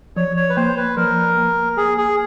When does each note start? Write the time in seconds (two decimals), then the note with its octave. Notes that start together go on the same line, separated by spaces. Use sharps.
0.16 F3 C#5
0.37 C#5
0.49 B4
0.57 A#3 C5
0.77 B4
0.96 F3 A#4
1.37 A#3
1.77 A#3 G#4
1.98 G#4